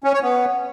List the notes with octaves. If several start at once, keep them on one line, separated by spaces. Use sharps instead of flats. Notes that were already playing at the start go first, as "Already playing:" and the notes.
C#4
C#5
B3